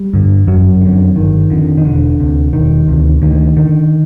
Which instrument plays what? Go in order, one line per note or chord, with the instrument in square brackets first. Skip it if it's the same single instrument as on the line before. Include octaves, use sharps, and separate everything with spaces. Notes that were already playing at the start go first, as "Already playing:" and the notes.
Already playing: [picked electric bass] G3
G2 D3
G1 F#2 F#3
F2 D3
G1 D#3
F2 D3
D#3
E1 D3
D2 C3
E1 D#3
D2 C3
D2 D#3
D3 D#3